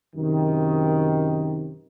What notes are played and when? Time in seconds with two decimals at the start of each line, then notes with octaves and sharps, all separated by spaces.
0.16 F#2 C3 D#3